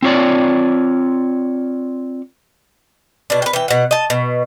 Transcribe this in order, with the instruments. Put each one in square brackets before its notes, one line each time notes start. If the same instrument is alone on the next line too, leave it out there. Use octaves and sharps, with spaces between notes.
[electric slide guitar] C4 F4 C#5 D5
[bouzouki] B2 D4
B4 G5
E3 G5
B2 F#5
D#5 A5
B2